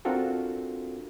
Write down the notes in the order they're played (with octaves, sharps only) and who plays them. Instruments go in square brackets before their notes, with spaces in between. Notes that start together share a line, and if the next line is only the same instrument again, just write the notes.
[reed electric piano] C4 D4 F4 F#4 A4 A#4